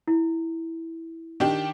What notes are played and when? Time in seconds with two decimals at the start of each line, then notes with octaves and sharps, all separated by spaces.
0.08 E4
1.40 D#3 D4 G4